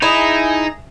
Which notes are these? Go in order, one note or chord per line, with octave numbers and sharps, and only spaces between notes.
D#4 E4 G#4 A#5 E7